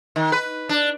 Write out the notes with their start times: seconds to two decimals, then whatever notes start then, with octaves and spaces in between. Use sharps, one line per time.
0.16 D#3
0.32 B4
0.69 D4